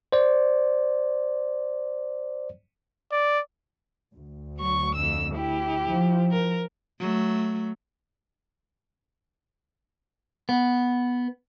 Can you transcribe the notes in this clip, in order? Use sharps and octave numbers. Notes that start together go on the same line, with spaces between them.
C5 D5
D5
D2
F#3 C#6
F2 E6
E4 G4
F3
A#4
F#3 A3
B3